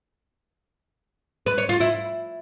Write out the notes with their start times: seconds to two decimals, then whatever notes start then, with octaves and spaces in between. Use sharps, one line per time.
1.46 B4
1.58 C#5
1.69 F4
1.80 E4